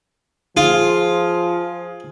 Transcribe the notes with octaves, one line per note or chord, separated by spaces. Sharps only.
F3 F4 G#4 F5 C6